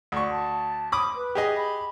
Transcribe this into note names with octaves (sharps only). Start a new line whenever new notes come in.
D2 C#6
A5
B5 D6 D#6
B4
G4 G#4 D#5
B5